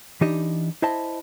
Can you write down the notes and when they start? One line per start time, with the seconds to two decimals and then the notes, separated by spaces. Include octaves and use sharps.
0.21 E3 D4 D#4 G4 D#5
0.82 E4 C5 D#5 E5 A5